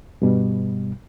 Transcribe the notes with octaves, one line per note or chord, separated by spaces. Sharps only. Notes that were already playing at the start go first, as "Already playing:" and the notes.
G2 B2 G3